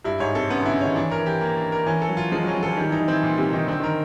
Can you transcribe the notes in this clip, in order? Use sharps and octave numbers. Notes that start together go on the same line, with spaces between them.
G2 E4
G#2 C#5
C3 A4
C#3 B3
D3 E4
C#3
D#3 C#5
E3 D4
A#4
E3
G4
A#3
D4
A#4
E3 C#4
A4
F#3
F4
F3 G#3
F#3
C#4
F#3
F3 A4
D#3 G3
E3 D#4
D#3
E3 C4
A#2
C3 G3
D#3 D#4
D3 C4
D#3 A#4